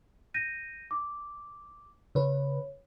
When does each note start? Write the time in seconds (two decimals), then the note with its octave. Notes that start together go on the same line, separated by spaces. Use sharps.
0.34 G6 A#6 D#7
0.91 D6
2.15 C#3 B4 C#5